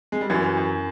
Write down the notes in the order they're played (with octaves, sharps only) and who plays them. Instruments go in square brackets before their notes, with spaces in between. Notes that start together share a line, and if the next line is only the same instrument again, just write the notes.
[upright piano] G#3
G3
[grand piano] F#2 [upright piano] E3 F#3
[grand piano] F#2